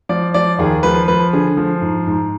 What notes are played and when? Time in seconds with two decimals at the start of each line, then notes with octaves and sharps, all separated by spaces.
0.09 F3 D5
0.34 F3 D5
0.59 D#2 G#4
0.83 F3 B4
1.08 F3 B4
1.33 D3 G#4
1.57 F3
1.82 G#2
2.07 G#2